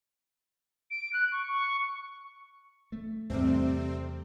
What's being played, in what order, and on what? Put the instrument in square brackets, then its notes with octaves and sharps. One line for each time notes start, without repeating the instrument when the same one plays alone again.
[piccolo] D7
F#6
C#6
C#6
[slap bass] A3
[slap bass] E2 [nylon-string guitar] C3 G3 A3 [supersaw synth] C4